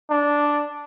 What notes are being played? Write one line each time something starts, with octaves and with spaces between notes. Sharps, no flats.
D4